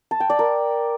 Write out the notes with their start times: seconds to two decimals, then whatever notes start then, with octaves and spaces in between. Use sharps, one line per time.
0.11 A5
0.20 G5
0.30 D5
0.39 A#4